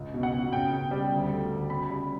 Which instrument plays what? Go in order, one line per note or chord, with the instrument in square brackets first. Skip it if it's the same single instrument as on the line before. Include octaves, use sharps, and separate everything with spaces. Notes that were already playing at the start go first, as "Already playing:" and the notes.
Already playing: [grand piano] C#2
B2
F#5
B2
C#3 G5
C#3
G3
D2
A3
D2
C#3 B5
G3